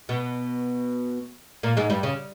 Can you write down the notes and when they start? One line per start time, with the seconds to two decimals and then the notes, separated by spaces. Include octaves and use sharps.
0.09 B2 B3
1.63 A#2 A#3
1.77 G#2 G#3
1.90 G2 G3
2.03 C#3